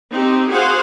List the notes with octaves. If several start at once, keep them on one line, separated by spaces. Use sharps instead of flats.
C4 D#4 G4
F#4 G#4 C5 F5 F#5